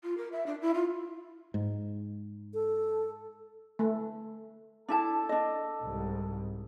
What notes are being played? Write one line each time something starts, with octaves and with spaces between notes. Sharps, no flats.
F4
A#4
E5
D4
E4
F4
G#2
A4
A3
D4 E4 A4 A5
D4 D#5
C2 G#2